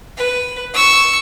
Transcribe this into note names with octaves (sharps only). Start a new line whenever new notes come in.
B4
C#6 E6